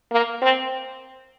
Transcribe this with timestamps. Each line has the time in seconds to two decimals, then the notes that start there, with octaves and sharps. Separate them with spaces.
0.12 A#3
0.42 C4